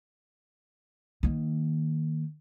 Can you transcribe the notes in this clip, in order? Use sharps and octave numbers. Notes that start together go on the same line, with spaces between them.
D#3 A#3